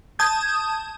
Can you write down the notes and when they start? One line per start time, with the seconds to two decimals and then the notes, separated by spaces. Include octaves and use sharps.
0.19 A5 D#6 G6 G#6